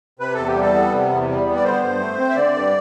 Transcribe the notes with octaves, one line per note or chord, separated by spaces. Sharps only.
C3 B4
E2 A4
G4
G3
A4
B3
C3
E2
G3
B3
D5
D3 C5
G2
A3
C4
E5
D3 D5
G2